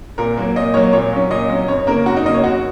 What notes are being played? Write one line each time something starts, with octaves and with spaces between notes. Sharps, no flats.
A#2 A#4
F#3 A#3
A#2 D#5
F#3 A#3 C#5
A#2 C#5
F#3 C#4
A#2 D#5
F#3 C#4
F#2 C#5
C#3 A#3 A#4
F#2 F#4
D#4
C#3 A#3 D#5
C#5
F#2 F#4